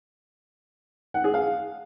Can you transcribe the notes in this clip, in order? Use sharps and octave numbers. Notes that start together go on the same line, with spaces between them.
F#5
G#4
F5